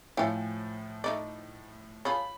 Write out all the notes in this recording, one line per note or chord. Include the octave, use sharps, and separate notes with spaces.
A2 F3 E4 F4 C#5 G5 G#5
A3 D#4 D5
F4 G#4 A4 C#5 B5